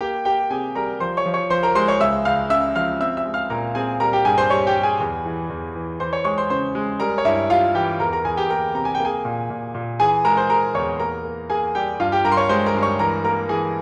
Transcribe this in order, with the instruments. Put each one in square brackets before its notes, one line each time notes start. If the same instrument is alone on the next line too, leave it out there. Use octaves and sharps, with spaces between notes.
[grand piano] A#3 G4 G5
A#3 G4 G5
C3 G#4 G#5
G3 A#4 A#5
F3 C5 C6
C#5 C#6
F3
C#5 C#6
F3 C5 C6
A#4 A#5
G#3 C5 C6
C#5 C#6
C#2 E5 E6
C#2 F5 F6
C#3 E5 E6
F3 F5 F6
C4 E5 E6
E5 E6
G#3
F5 F6
A#2 A#4 A#5
C4 G#4 G#5
G3 A#4 A#5
G4 G5
G2 G#4 G#5
C5 C6
G3 C#5 C#6
G4 G5
G3
G#4 G#5
E2
E3
E2
E3
E3 C5 C6
C#5 C#6
G#3 C#5 C#6
C5 C6
C#3 C5 C6
G#3
G3 A#4 A#5
C#5
G2 E4 E5
G3 F4 F5
E3 G4 G5
E2 A#4 A#5
A#4 A#5
E2 G#4 G#5
G4 G5
A#3 A#4 A#5
C3 A#5
G#5
G5
A#3
G#4 G#5
A#2
A#2
A#2
E3 G#4 G#5
G#3 A#4 A#5
C5 C6
G#3 A#4 A#5
E2 C#5 C#6
A#3 A#4 A#5
A#3
A#3 G#4 G#5
G3 G4 G5
G2 F4 F5
G4 G5
G2 A#4 A#5
C6
C#5 C#6
G#3 C5 C6
A#4 A#5
G2
C#5 C#6
E3 A#4 A#5
A#3 A#4 A#5
E3 G#4 G#5